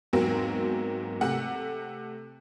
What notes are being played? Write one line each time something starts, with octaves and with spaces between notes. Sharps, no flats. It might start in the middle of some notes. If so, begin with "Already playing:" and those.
E2 G#2 F#3 A#3 C4
C3 A3 F#5